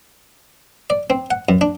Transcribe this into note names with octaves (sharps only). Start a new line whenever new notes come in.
D5
C4
F#5
F#2
D4